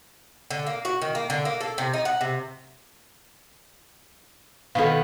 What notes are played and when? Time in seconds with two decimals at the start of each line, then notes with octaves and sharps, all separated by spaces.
0.51 D3
0.66 A#3
0.85 F#4
1.02 D#3
1.15 A#3
1.30 D3
1.45 A#3
1.61 A4
1.78 C3
1.93 D#4
2.05 F#5
2.21 C3
4.75 B2 D#3 B3 A4 F5